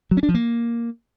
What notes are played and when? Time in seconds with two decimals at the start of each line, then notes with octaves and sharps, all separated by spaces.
0.11 F#3
0.17 C#4
0.23 D4
0.29 F3
0.34 A#3